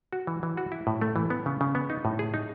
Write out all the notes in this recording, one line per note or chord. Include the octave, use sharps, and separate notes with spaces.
F#4
E3
E3
F#4
E4
A2
A3
E3
B3
C#3
C#3
B3
D#4
A2
G#4
D#4